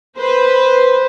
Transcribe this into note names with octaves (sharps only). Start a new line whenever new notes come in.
B4 C5